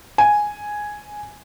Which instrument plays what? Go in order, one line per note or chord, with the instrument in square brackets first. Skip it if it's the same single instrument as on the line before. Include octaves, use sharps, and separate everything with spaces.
[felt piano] G#5